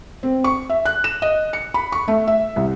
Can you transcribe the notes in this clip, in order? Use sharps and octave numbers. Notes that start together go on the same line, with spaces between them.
C4
C#6
E5
F#6
E7
D#5
C#7
B5
C#6
A3
E5
C2